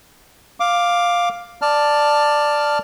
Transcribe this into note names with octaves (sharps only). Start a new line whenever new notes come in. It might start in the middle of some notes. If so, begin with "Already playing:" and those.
F5 D6
D5 A5 F6